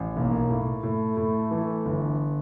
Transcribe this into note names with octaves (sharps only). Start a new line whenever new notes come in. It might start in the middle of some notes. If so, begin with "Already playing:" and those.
Already playing: A1
B1 A#3
A2
A2 A3
A2
E3
G1